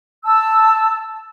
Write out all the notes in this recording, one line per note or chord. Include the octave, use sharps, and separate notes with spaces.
A5 E6